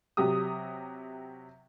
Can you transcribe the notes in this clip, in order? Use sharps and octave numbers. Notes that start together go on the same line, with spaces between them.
C3 F#3 G4 D#6